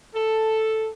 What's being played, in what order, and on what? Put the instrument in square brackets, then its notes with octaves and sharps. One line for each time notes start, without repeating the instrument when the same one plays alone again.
[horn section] A4